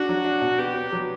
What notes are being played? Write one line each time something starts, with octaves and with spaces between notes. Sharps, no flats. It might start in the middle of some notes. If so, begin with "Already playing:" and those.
Already playing: D4 F#4
F#3
D4
B2
B3 G4
B3
F#3